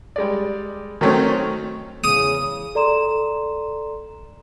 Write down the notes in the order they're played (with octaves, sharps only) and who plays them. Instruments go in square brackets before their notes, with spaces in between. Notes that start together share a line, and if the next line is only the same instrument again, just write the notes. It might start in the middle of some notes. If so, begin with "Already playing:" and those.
[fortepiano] G3 G#3 D5
D#3 F#3 A3 C4 C#4
[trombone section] E2 C#3 [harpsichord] D#6
[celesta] A4 D5 A#5 C6 E7